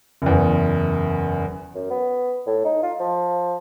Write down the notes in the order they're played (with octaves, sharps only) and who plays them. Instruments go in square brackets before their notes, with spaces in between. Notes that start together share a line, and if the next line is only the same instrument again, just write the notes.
[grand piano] F#1 E2
[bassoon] F#2
B3
A2
D#4
F4
F3